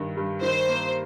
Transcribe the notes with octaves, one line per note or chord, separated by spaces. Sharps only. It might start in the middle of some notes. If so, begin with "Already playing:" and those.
Already playing: G2 D#3
G2
D#3 C5
A#3